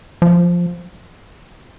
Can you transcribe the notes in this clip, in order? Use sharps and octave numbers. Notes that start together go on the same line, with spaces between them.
F3